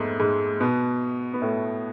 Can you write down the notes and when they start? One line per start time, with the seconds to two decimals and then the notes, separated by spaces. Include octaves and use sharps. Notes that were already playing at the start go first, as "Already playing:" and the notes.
Already playing: F2 G#2 G#3 A3 B3
0.20 G#2 G#3
0.60 B2 B3
1.33 B3
1.42 A2 A3